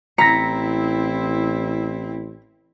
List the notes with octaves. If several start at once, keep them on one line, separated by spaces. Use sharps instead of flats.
A1 C4 E4 A#5 A#6 B6 C#7